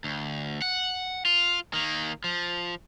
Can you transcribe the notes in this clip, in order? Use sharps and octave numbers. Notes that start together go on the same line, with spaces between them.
D2
F#5
F4
D#3 A#3
F3